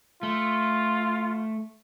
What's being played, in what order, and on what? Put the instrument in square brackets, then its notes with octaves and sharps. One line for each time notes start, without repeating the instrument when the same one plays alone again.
[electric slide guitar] A3 [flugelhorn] F4